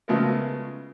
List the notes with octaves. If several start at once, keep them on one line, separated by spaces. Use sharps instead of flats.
C#3 F3 G#3 A3 B3 A#4